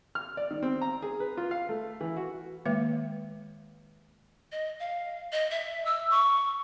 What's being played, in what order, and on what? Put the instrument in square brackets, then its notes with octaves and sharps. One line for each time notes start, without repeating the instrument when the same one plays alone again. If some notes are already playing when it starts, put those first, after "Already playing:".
[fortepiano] F6
D5
D#3
C4
A#5
G#4
B4
F4
F5
A3
E3
F#4
[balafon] D#3 G#3 A#3 B4 E5
[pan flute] D#5
F5
D#5
E5
E6
C#6